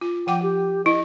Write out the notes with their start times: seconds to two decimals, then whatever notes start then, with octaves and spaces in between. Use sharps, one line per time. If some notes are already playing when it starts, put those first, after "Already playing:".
0.01 F4
0.27 F3 F#5 G5 D6
0.43 G4
0.86 E4 D#5